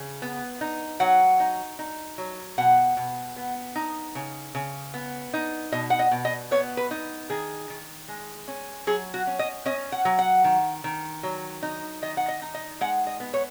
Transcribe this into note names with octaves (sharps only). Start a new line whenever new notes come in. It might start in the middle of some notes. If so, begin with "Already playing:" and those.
Already playing: C#3
B3
D#4
F#3 F#5
D#4
D#4
F#3
B2 F#5
B2
B3
D#4
C#3
C#3
B3
D#4
B2 D#5
F#5
D#5
B2
D#5
B3 C#5
B4
D#4
D#3 G#4
D#3
G#3
C#4
F#3 G#4
F#4
C#4
D#5
C#4 D#5
F#5
F#3
F#5
D#3
D#3
F#3
D#4
D#3 D#5
F#5
D#5
D#4
D#5
G#3 F#5
D#5
B3
C#5